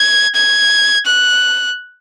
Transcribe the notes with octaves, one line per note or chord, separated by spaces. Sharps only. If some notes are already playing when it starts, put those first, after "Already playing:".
Already playing: G#6
G#6
F#6